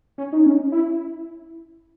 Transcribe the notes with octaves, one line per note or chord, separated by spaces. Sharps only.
C#4
D#4
C#4
E4